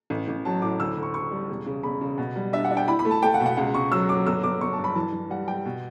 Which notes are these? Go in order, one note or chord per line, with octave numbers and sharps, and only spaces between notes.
A1
A1
F#3 A5
A2 D6
D2 E6
D2
C#6
D2 C#6
G3
E1
C#3
E1 B5
C#3
B2
G3
D4 E5
F#5
D4
G5
E4 B5
B5
A3
A5
A3 G5
F#5
B2
F#5
C#2 F#5
C#2 C#6
F#3 E6
F#3 D6
G1 E6
G1 D6
G1 C#6
A5
G2
B5
E3 A5
E3
G3 F#5
G3 G5
B2